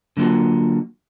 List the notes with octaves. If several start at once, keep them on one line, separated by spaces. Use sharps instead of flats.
D3 F#3 A#3 F4 F#4